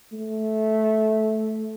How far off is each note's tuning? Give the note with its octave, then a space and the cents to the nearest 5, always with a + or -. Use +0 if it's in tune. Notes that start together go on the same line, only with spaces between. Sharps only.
A3 -15